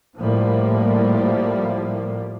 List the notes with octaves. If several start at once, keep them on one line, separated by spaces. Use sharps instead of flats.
A2 F3 G3 A#3